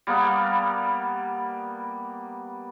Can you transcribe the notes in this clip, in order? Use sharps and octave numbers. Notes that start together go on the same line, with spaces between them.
G3 A#3 B3